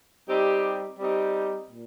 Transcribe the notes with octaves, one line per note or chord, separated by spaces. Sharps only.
G3 C4 D#4 G4
G3 C4 D#4 G4
A#2